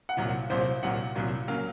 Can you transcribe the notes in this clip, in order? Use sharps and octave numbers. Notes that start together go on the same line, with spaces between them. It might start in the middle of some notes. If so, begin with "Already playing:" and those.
F#5
C2 A#2 F#3
C2 A#2 F#3 C5
C2 A#2 F#3 F#5
C2 A#2 F#3
C#3 F#3 A#3 F5